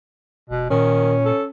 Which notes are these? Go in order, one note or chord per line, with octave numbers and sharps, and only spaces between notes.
E1 B2
A#2 D#3 C#4
A4